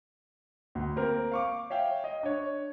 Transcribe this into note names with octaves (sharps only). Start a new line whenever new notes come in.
D2
A#3 C4 A#4
F5 C#6 D6
C#5 E5 F5 G5
D#5
D4 C#5